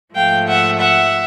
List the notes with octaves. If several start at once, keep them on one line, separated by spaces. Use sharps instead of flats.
G#2 F3 A3 F5 G5
E5 F#5
E5 F#5